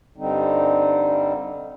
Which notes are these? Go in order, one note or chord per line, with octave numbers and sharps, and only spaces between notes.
G2 D3 G3 C4 D#4